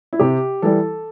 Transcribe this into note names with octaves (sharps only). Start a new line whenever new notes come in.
E4
C3 G4
E3 G3 A4